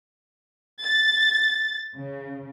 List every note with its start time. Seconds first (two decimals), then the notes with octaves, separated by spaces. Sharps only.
0.83 A6
1.95 C#3